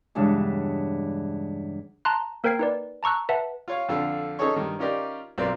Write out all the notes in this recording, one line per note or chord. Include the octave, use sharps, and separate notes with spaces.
E2 G2 C#3 E3 G#3 D4
A5 A#5 C6 F#6
A#3 A#4 C5 G5 G#6 C7
D#4 B4 D5
A5 A#5 C#6 E6 F#6
B4 E5 F#5 A5
F4 C#5 F5
F2 D3 F4 A4
C#4 D#4 G#4 A4 C#5 C#6
G2 D#3
C#4 D#4 F4 G4 A#4 D5
B1 C4 F4 A#4 D5